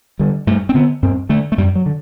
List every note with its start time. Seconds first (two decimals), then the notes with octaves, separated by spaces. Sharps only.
0.19 D3 G3
0.47 G2 A3
0.69 C4
0.74 D3 B3
1.03 G2 C4
1.29 D3 A3
1.52 A3
1.58 F#2 G3
1.75 F#3
1.86 D3